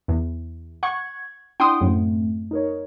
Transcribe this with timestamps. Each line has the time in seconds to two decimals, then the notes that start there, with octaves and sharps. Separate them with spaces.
0.08 E2
0.83 F#5 C#6 G#6
1.60 D4 E4 F#5 G5 C6 D#6
1.81 F#2 A2 A3 C4
2.51 D#4 A#4 C#5